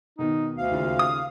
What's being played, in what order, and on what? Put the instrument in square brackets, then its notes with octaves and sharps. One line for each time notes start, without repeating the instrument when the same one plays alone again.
[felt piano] B2 D#3 [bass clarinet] D#4
[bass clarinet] D2 [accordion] F5
[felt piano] D#2 C#3 F4
[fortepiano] D#6